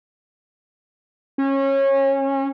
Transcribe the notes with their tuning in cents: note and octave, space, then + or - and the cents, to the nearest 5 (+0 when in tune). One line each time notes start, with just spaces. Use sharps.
C#4 -25